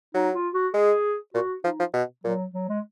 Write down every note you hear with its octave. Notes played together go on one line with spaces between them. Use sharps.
F#3 D#4
F4
F#4
G#3 G#4
A#2 F#4
F3 D#4
F3
B2
A#2 F#3
F#3
G#3